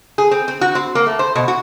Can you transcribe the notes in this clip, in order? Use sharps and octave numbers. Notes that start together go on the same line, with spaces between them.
G#4
C4
C4
F#4
C4
A#3
A3
C5
B2
F#4